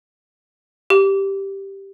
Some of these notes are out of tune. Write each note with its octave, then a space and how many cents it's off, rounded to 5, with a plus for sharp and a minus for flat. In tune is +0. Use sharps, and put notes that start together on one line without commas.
G4 +0 D6 -25